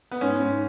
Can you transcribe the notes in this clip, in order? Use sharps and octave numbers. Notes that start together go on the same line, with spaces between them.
B3
G#2 C#4
G#2